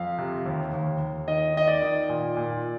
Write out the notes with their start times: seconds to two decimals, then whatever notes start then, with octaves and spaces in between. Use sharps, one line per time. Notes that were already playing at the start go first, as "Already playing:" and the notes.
Already playing: F2 F5
0.18 C3
0.46 D#2
0.73 D#2
1.00 D#2
1.28 D#3 D#5
1.54 D#3 D#5
1.68 D5
1.82 D#3
2.09 A#2
2.37 A#2